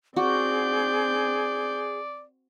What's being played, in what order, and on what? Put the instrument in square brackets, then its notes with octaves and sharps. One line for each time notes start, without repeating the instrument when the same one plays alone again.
[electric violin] C4 G6 [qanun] F#4 [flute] G#4 [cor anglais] D5